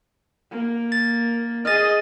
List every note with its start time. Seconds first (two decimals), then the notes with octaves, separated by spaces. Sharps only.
0.51 A#3
0.92 A6
1.65 G#4 D#5 F6 A6